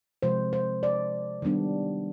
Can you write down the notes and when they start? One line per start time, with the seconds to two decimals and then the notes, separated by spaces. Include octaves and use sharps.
0.22 C3 F3 G#3 C5
0.53 C5
0.83 D5
1.42 D#3 G3 B3 D4